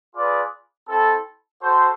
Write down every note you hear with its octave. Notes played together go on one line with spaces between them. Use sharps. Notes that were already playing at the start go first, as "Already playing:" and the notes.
F4 G#4 B4 D5
C4 E4 A4
F#4 A4 C5